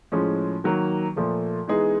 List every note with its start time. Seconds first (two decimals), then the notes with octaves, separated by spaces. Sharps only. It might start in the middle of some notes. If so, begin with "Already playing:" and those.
0.12 A2 F3 G#3 C#4
0.64 D#3 F#3 A#3
1.16 A#2 F3 A3
1.68 E3 G#3 B3 D#4 G#4